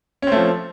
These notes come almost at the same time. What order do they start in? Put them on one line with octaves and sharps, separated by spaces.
C#4 C4 A3 F3